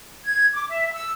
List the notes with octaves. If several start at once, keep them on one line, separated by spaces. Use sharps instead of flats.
G#6
D6
E5
E6